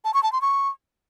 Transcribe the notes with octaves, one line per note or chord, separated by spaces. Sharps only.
A5
C#6
A5
C6
C#6